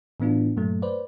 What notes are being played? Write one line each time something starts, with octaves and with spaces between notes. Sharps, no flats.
A2 E3 B3 D4 F4
G2 A#2 F#3 A3
B4 C5 D5